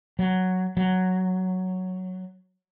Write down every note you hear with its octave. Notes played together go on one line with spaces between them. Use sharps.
F#3
F#3